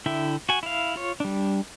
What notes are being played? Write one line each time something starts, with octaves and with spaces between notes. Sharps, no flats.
D3 E4 E5 G5
F#4 G#5
E4 F5
F4 C#5
G3 D4